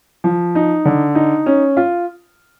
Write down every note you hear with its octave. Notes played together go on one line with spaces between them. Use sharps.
F3
D#4
D3
D#4
C#4
F4